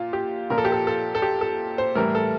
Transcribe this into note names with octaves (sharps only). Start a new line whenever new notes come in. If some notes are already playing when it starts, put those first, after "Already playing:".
Already playing: A#2 F4
G4
A#2 F3 A#4
A4
G4
A4
A4
A4
G4
A4
C5
A2 E3 G3 A#4
A4